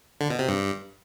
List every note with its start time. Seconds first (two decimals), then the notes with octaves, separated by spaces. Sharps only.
0.21 D3
0.30 B2
0.39 C3
0.48 G2